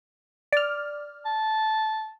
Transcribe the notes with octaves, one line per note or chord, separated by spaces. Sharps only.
D5 F6
A5